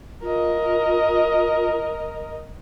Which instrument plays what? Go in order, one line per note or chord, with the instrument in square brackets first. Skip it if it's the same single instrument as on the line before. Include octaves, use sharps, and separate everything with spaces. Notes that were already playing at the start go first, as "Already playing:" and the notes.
[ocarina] F4 [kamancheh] A#4 D#5